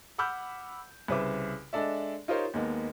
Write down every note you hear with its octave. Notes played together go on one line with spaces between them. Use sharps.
F#5 B5 D6 E6 F6 G6
C2 C#3 B4 C5 E5 D6
G#3 D4 A4 D5 E5
D#4 F4 G4 A#4 C5 C#5
D#2 G#3 A#3 B3